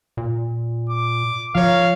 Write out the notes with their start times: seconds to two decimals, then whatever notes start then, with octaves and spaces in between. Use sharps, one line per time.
0.17 A#2
0.90 D6
1.55 F3 A#4 C#5 F5